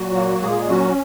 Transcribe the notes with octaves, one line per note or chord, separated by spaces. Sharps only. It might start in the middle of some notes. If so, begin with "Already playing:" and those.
Already playing: A#2 F#3 F#4
A#3
A#2 G#3 G#4
F#3 C#4 F#4